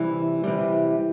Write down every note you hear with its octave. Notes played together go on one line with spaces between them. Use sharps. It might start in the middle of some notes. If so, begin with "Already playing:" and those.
Already playing: C3 E3 G3
C3 E3 G3